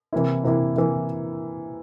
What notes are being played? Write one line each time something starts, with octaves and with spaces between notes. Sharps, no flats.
C3 E3 A#3 E4
C3 E3 A#3 E4
C3 E3 A#3 E4